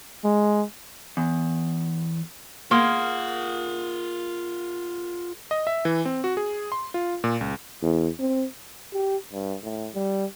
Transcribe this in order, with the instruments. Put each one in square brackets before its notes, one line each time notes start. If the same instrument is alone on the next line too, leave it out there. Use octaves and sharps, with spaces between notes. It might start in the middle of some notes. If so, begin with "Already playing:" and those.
[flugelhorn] G#3
[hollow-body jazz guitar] E2
[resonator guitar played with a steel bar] A#3 [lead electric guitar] F4 F#5 [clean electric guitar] G#4 A#4 C6
[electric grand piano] D#5
E5
E3
C4
F#4
G#4
C6
F4
A#2
C#2
[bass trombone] E2
C4
[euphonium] G4
G2
A2
G3